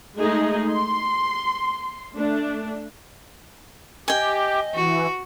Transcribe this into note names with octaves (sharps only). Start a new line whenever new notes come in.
G#3 A3 D#4 G#4 D#5
C6
A3 D4
G4 D#5 G5 G#5
E3 F#4